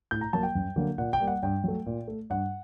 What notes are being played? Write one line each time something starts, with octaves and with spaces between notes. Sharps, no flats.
A2 G6
A#5
F#3 A#3 A5
G5
F#2
D3 F#3 A#3
A#2 F#5
G5
G3 A#3
F#5
G2 G5
F#3 A3
A#2
A3
G2 F#5